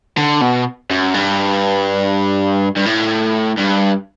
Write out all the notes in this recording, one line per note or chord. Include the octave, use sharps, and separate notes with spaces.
D3
B2
F#2
G2
G2
A2
G2